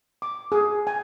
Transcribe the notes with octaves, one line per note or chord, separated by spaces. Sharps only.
D6
G#4
G#5